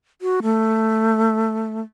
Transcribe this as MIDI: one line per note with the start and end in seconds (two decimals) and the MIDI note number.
0.22 0.40 66
0.43 1.81 57